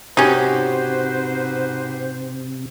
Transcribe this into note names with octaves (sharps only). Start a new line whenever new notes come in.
G#2 C3 C#4 D#4 F#4 G4 B4 C5